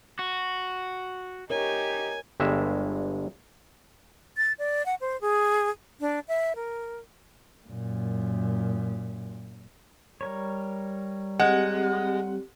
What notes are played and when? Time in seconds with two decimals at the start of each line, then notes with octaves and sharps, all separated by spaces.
0.19 F#4
1.50 D#4 G4 A#4 C#5 G#5
2.40 G1 G2 G#3 E5
4.37 A6
4.59 D5
4.86 F#5
5.01 C5
5.21 G#4
6.01 D4
6.28 E5
6.56 A#4
7.67 F#2 A#2
10.21 G3 A#4 C#5
11.40 G#3 C4 G4 F#5